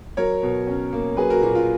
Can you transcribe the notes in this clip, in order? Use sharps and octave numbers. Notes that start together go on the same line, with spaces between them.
F#3 A#4 C#5
B2
C#4
A#3
F#3 G#4 B4
F#4 A#4
A#2 F#4
F4